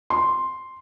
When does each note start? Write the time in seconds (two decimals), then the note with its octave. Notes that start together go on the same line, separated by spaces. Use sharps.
0.10 C6